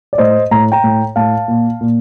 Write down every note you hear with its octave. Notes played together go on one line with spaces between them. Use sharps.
D5
A2 C5 D#5
A2 A#5
G5 A#5
A2
A2 F5 A5
A#2
A#2